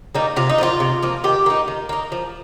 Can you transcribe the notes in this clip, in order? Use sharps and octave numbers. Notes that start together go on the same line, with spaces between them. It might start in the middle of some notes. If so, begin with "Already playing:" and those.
G3 A#3 D#4
C3 F4
D#4
F3 A#3 F4
C3
F3 A#3
D#3 G4
A#3 D#4
D#3
A#3 D#4
F3